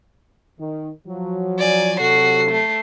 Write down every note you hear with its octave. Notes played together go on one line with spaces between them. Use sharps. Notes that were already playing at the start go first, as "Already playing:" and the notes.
D#3
F3 F#3
D5 G#5
C3 F#3 F#4 A4 C7
A3 C7